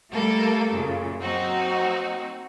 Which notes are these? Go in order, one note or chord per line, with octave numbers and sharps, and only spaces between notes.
G3 A3 A#3 A4 A#4
F#2 A#2 C#3
F#3 A#3 C4 D#4 F#4